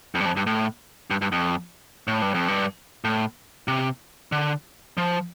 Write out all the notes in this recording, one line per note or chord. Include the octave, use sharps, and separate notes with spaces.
F2
G2
F2
G2
A2
G2
G2
F2
A2
G2
F2
G2
A2
C3
D3
F3